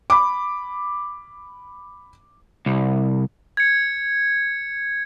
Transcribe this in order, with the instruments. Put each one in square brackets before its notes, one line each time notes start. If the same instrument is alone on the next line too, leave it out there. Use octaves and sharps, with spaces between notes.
[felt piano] B5 D6
[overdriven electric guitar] C2
[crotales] G#6 C#7